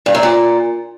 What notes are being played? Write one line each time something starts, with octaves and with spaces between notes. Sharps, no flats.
G2
F#2
A#2